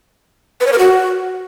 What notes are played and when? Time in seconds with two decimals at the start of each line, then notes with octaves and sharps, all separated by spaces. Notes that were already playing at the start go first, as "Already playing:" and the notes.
0.61 B4
0.67 C#5
0.73 A#4
0.79 F#4